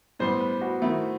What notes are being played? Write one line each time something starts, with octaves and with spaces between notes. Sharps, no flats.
A2 G3 B3 C5
B4
F#4
D#3 A3 C4 E4